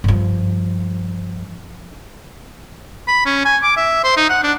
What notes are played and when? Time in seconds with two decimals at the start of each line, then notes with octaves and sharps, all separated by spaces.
0.04 G2 F3
3.08 B5
3.26 C#4
3.45 G#5
3.63 D6
3.77 E5
4.04 C5
4.17 D#4
4.30 F#5
4.43 D4